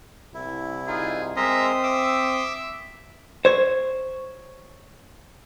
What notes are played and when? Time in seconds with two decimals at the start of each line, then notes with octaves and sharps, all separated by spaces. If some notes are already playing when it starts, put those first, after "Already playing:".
0.34 C2 E4
0.87 D#4 F4 G#4
1.37 G#3 C4 A#4 E5 A#5 C6 D#6
1.83 E5 D6 E6
3.45 C5 C#5